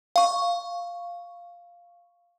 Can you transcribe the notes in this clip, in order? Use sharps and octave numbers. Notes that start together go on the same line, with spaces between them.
F5 C#6